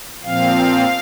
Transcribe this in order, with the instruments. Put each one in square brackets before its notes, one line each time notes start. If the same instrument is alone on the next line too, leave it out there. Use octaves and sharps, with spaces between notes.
[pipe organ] A#2 F3 C4 F5